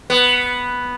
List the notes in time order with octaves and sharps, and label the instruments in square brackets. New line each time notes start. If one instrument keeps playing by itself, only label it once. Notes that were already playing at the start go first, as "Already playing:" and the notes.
[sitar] B3